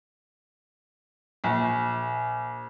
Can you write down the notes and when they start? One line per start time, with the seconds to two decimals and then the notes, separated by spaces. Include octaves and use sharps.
1.44 A#1